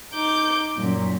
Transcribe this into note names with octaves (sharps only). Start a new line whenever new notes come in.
D#4 D6 G6
F#2 A#2